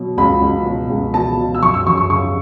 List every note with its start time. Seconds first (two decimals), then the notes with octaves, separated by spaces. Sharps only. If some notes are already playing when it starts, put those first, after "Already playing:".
Already playing: B2 F#3
0.18 C#2 B5
0.42 C#2
0.66 B2
0.90 C#2
1.14 B2 A5
1.38 B2
1.55 E6
1.62 F#2 C#6
1.74 E6
1.87 F#2 C#6
1.98 C#6
2.10 C#3 C#6